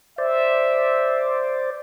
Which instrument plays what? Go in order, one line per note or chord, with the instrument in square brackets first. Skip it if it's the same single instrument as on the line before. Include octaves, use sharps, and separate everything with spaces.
[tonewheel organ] C5 D5 [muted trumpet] E5